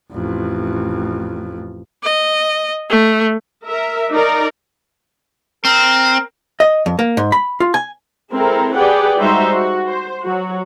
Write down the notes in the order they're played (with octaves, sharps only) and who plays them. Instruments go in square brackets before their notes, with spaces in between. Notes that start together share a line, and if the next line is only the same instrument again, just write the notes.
[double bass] A1 F2
[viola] D#5
A3
[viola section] A#4 E5
D#4 A#4 D5
[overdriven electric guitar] C4 [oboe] A#4
[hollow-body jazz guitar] D#5
F2
A#3
G#2
B5
F4
G#5
[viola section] G#3 C4 E4 A4 A#4
G4 G#4 B4 D5 F#5 G5
G3 G#3 D#4 F#4 C5 E5
F#4
C5
F#3 F#4